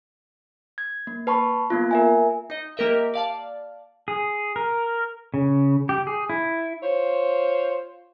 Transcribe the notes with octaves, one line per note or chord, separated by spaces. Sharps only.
G#6
A#3
B4 A5 B5 C#6
A#3 B3 F4
A#4 E5 G#5
D#4 D#5
A#3 G4 A#4 D#5 E5
D5 F5 A5
G#4
A#4
C#3
G4
G#4
E4
F4 C5 C#5